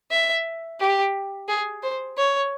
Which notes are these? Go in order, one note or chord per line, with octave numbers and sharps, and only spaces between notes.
E5
G4
G#4
C5
C#5